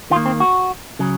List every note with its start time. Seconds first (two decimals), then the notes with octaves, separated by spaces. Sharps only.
0.11 D#3 F4
0.16 A#3
0.26 C4
0.40 F#4
0.99 C#3 F#3